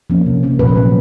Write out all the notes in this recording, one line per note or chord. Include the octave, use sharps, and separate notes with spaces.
F3 A#3 C#4
C3
F3 A#3 C#4
A#2 B4
F#3 A3 C#4